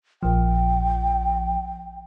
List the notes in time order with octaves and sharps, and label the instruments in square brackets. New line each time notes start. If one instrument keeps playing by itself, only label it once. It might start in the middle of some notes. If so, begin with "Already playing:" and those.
[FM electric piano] A#1 F3 [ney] G5